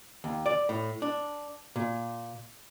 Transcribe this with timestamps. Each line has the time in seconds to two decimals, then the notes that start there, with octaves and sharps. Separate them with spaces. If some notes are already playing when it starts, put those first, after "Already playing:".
0.24 D#2
0.46 D5
0.69 A2
1.02 D4
1.76 A#2